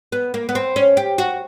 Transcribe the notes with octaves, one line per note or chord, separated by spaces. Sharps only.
B3
A#3
B3
C4
C#4
G4
F#4